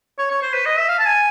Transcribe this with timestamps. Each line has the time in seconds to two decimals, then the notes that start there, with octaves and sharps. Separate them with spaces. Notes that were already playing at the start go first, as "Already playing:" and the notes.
0.19 C#5
0.31 C#5
0.42 C5
0.54 B4
0.66 D#5
0.78 E5
0.89 F5
0.99 A5
1.06 G#5